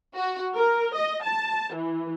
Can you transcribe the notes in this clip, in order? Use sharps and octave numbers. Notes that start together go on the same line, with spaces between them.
F#4
A#4
D#5
A5
E3